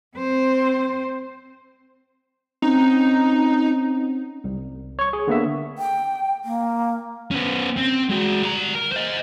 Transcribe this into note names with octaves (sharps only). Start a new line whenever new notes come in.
C4 C5
C4 C#4 D#4 A#5
C2
C#5 C#6
G#4
D3 A#3 B3 E5
G5
A#3
B3 C#4
C4
G#3 F#4
G3 A#5
A#4
C5 D#5